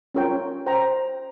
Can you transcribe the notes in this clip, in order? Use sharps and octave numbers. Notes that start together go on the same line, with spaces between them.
C#4 F4 A#4 C#5 G5
C5 G5 A#5